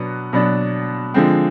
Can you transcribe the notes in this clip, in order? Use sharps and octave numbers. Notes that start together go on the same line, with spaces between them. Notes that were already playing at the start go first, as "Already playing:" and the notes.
Already playing: B2 F#3 B3 D4
B2 F#3 B3 D4
D3 F3 G#3 C4